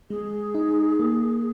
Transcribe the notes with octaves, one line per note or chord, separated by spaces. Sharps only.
G#3 G#4
D#4
A#3